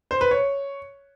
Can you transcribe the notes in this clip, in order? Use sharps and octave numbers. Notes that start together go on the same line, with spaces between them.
C5
B4
C#5